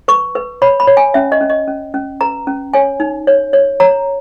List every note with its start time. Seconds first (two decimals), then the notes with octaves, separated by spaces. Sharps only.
0.08 B4 C#6
0.35 B4
0.62 C#5 B5
0.80 B5
0.87 C#5
0.97 G#5
1.14 C#4 E5
1.32 D#5
1.41 C#4
1.50 D#5
1.67 C#4
1.94 C#4
2.21 B4 A#5
2.47 C#4
2.74 C#5 G#5
3.00 D#4
3.27 C#5
3.53 C#5
3.80 C#5 A#5